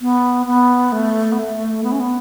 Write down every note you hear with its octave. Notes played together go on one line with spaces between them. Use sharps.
B3
B3
A3
B3
A3
B3
C#4
B3